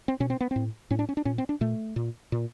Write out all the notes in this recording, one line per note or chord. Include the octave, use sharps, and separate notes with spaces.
C4
B2 C#4
C4
B3
A2 C4
A2 C#4
D4
C#4
D4
A#2 C#4
C4
D4
A#2 A3
A#2
A#2